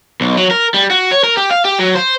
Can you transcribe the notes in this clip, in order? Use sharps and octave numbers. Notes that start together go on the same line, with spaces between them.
B1
F#3
A#4
G3
F#4
C#5
A#4
G4
F5
G4
F#3
C5